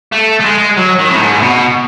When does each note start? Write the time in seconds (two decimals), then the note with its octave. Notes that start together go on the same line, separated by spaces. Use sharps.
0.12 A3
0.40 A3
0.45 G#3
0.77 F#3
0.99 D#3
1.10 A2
1.21 G#2
1.37 A2
1.42 B2